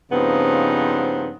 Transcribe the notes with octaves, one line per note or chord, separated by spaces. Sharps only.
G2 C#3 F3 B3 C4 D#4